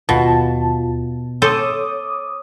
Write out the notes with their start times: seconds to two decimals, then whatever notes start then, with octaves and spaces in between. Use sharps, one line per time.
0.09 D#2 B2 F4 A5
1.42 A4 C5 C#5 D6 D#6